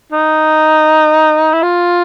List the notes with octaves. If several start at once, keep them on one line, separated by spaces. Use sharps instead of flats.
D#4
E4
F4